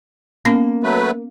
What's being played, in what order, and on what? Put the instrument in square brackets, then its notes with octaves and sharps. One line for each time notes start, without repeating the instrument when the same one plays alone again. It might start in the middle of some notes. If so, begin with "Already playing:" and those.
[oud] A#3 [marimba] B3 C#4
[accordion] F#3 A3 B4